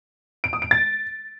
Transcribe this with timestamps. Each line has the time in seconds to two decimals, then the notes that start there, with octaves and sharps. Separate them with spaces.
0.44 D7
0.53 D#6
0.62 D7
0.71 A6